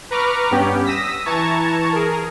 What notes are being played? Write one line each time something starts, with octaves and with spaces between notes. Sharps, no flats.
B4 A#5 C#6 D6 F6
G2 B3 C#4 G4
D#6 E6 A#6 B6
E3 A5 A#5 C#6 G#6
G#4 A#4